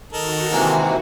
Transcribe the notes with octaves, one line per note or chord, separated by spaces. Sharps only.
D#3 D#4 F#4 A4 A#4
G#2 C3 E3 G#3 A#3